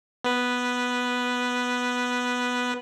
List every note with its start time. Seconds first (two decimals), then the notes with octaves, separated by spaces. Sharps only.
0.24 B3 B4